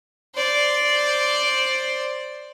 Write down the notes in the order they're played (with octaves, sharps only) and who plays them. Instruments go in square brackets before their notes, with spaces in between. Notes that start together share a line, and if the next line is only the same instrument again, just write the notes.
[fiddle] C5 D5